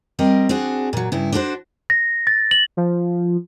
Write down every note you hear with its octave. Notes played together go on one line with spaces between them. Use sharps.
G3 C4 A#4 D#5
C4 D4 F#4 G#4
A#2 F#3
G2 C#3 E4
D4 F#4 A4 A#4 C5
A#6
A6
F#7
F3